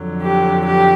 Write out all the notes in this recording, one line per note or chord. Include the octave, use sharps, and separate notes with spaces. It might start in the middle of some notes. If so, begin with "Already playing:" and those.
Already playing: F2 D3 F#3
G4
G4